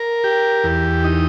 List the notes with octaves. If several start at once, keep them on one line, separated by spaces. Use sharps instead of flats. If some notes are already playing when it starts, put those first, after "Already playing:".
Already playing: A#4
G4
E2
D#4